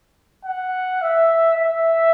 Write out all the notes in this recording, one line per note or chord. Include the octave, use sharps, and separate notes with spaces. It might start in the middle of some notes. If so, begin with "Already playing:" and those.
F#5
E5
E5